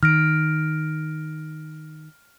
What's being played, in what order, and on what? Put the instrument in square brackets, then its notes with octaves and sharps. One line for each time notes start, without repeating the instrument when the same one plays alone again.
[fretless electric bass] D#3 [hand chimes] F6 A#6 D7